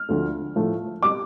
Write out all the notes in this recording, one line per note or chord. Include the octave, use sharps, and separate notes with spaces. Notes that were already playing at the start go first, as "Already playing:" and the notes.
Already playing: F6
D2 D3 F3 A3
A2 F3 A3
G3 D6